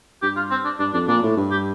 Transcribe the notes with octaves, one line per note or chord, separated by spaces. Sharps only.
G2 G4
F4
C4
D4
G2 D4
F2 D4
A#2 D4
A2
G2
G4